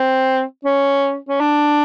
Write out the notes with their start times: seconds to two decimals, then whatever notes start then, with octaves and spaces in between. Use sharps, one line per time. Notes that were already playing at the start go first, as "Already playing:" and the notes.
Already playing: C4
0.65 C#4
1.29 C#4
1.40 D4